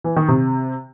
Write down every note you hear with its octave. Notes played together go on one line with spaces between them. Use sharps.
E3
D#3
C3